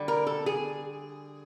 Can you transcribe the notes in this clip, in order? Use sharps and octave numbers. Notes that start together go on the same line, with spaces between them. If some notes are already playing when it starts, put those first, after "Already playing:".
Already playing: D3 G3
A#4
A4
G#4